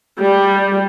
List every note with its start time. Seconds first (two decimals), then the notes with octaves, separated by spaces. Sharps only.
0.18 G3